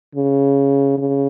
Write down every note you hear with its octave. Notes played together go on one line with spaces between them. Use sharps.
C#3
C#3